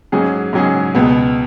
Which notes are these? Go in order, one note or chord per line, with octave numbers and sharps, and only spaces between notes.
G#2 F#3 C#4 G#4
G#2 F#3 C#4 G#4
C#2 B2 B3